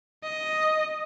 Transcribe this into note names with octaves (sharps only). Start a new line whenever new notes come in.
D#5